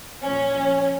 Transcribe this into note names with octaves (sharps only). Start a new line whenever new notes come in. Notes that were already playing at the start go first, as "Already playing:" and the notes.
A#2 F3 C#4